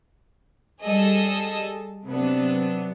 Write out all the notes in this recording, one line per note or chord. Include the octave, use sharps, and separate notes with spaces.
G3 G#4 A4 D#5 E6
C3 F#3 B3 D4